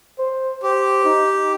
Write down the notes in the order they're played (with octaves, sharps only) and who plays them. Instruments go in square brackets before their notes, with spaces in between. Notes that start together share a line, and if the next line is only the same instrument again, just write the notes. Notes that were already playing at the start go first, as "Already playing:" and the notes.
[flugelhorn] C5
[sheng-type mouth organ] G4 [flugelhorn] C5
[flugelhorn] D#4